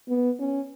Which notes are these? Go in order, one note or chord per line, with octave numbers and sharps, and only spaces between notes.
B3
C#4